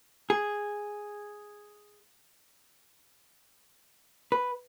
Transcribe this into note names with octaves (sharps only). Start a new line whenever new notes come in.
G#4
B4